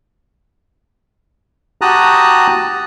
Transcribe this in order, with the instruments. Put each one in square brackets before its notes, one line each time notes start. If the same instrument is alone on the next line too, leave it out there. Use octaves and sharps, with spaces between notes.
[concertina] F#4 G4 A5 A#5 D#6 F#6